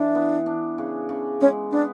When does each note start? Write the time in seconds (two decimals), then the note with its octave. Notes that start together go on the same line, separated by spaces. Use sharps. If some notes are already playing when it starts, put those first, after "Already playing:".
Already playing: E3 D4
0.15 B3
0.46 D4
0.78 C#3
1.09 C#3
1.41 G#3 C#4
1.71 B3 D4